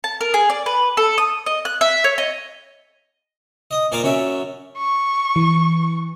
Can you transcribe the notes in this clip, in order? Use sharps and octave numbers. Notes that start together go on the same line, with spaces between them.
A5
A#4
G#4
D5
B4
A4
D#6
D#5
F#6
E5
C#5
D#5
D#5 D#6
A#2 C5 D5 F5 G#5 A#5
F#2 C#4 F#4 E5
C#6
E3